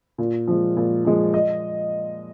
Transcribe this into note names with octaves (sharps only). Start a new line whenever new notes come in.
A#2
F3 G#3
A#2
F3 G#3
D#5